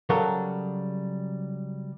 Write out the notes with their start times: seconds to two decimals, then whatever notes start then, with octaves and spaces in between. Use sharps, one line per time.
0.09 C#3 F#3 G3 A4 A#4